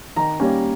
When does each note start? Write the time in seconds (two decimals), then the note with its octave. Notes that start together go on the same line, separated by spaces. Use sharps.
0.16 D#3 A#5
0.40 G3 A#3 C#4